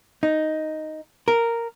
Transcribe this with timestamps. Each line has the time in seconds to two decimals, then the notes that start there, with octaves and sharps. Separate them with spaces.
0.23 D#4
1.28 A#4